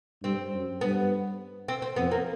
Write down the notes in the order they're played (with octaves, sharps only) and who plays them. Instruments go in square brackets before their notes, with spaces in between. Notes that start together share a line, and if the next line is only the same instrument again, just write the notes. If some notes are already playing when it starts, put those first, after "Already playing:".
[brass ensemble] G2 [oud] C4
[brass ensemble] F#2
[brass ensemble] G2 [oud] B3
[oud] C4
C4
[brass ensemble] F2 [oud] B3
[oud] A#3